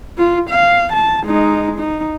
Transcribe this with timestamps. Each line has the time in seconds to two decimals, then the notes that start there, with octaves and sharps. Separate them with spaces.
0.18 F4
0.50 F5
0.93 A5
1.25 G#3 D#4
1.79 D#4